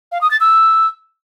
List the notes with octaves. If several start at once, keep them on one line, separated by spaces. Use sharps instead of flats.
F5
D#6
A6
E6